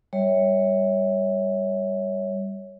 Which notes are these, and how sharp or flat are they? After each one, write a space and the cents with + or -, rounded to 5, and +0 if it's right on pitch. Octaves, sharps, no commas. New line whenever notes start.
G3 +0 C#5 +5 E5 -20